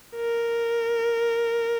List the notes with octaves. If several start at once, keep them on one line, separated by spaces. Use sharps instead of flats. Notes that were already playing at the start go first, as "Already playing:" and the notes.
A#4